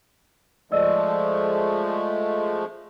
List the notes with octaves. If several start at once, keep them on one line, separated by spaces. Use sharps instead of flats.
F3 G#3 A3 D5 D#5 E6